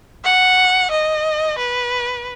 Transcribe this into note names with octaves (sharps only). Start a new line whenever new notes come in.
F#5
D#5
B4